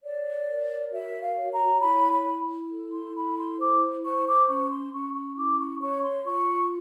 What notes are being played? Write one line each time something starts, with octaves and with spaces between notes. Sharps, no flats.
C#5 D5
A#4
F#4 E5
F5
C#5
A#5
E4 B5
B5
E4
A4
C6
E4 B5
C6
C5 D6
C5 C#6
D6
C#4 C#6
C6
C#4 C#6
C#6
E4 D6
C#6
C#5 C#6
C6
F4 C#6